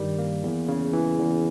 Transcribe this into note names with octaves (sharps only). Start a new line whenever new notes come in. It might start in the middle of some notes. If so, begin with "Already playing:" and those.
Already playing: G2 D#3 G3
A#3
E2
C#3
E3
E2